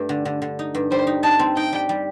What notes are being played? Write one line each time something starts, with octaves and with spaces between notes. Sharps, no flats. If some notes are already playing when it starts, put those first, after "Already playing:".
Already playing: G2 A3
D3
D3
D3
D#4
G2
G3 C5
D#4
D#4 A5
C4
D#4 G5
G3
G3